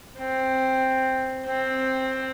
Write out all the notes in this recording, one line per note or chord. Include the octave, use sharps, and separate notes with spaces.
C4
C4